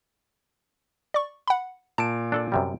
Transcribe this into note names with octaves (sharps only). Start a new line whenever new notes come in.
D5 C#6
F#5 B5
A#2 A5 D7
D4 A4 D5
F#2 C3 G3